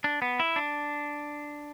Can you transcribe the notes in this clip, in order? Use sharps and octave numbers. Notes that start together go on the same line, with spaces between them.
D4
B3
E4
D4